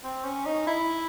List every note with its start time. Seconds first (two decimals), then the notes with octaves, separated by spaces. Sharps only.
0.04 C4
0.24 C#4
0.46 D#4
0.67 E4